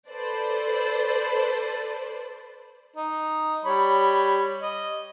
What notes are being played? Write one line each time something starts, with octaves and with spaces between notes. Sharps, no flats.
A4 B4 C5 D5
D#4
G3 C#5 B5
D#5